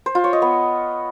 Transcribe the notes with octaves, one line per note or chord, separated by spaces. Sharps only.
C5
F4
C#5
D#5
B3